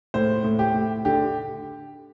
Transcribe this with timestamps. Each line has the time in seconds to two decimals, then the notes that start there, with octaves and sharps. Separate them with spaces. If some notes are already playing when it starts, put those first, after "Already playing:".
0.14 A2 C5
0.44 A2
0.59 G4
0.74 A2
1.05 D3 G4